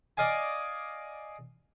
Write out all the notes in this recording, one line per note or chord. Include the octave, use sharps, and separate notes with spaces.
D5 D#5 F5 G#5